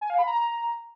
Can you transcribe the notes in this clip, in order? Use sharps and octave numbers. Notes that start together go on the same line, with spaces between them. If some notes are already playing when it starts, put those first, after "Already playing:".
G#5
F5
B5
A#5